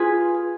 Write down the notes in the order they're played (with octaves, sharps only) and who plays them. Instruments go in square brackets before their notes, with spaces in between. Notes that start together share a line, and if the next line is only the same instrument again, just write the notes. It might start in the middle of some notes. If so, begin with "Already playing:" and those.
Already playing: [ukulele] F4 G#4 B4